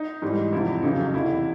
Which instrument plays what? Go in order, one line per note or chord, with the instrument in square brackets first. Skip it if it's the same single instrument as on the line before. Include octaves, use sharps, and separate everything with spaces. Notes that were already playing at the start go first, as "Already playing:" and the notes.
Already playing: [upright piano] D#4
G#2 E3 G3
E2 C3 F3 E4
F2 C#3 F#3 D#4
E2 C3 E3 E4